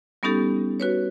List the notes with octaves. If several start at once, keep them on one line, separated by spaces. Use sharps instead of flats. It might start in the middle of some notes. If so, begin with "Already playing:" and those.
G3 B3 C#4 D#4 G4 A4
F#4 B4 C#5